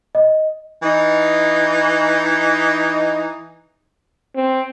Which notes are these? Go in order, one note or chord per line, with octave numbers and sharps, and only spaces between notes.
D#5
E3 D#4
C4